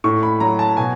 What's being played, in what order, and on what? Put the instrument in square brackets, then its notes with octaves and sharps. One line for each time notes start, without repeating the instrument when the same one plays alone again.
[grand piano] A2 C#6
B5
F#3 A#5
A5
B2 G#5